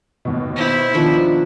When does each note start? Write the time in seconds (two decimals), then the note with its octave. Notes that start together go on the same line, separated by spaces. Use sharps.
0.25 D#2 B2
0.56 E4 C5
0.94 D#3 F3 D4